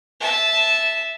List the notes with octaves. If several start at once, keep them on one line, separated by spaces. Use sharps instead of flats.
E5 A5